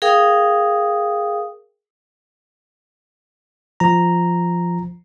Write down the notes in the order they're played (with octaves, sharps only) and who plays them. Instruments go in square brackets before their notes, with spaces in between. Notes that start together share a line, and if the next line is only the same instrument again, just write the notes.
[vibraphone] G#4 A#4 F5 G5 D#6
[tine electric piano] F3 A#5